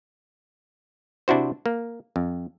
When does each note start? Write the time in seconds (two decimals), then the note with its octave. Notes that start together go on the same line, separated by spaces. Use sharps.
1.28 C3 D4 E4 F#4 C5
1.66 A#3
2.16 F2